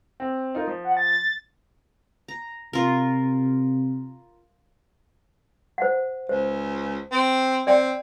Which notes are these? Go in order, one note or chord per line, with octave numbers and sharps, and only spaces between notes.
C4
D#4 F4 A#4
F3
F#5
A6
A#5
C3 F4 A#4
C5 F#5
C#2 C5
C4
C4 D5 G5